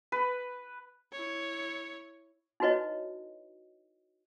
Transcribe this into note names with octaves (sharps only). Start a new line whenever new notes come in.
B4
E4 C#5
D#4 E4 F#4 B4 C#5 D#5